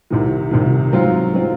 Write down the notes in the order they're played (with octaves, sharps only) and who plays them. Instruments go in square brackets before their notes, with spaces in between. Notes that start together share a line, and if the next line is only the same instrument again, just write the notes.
[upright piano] C2 C3 D#3
C2 C3 D#3
G#2 F#3 C4 F4
F#3 C4 F4